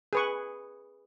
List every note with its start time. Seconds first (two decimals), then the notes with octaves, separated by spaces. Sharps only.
0.13 G#4 B4 C#6